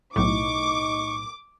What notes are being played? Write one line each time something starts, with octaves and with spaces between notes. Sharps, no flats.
B1 A2 D#4 C#6 D6